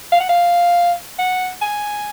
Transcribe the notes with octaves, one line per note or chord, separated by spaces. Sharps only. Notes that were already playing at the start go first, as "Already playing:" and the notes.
F5
F#5
F5
F#5
G#5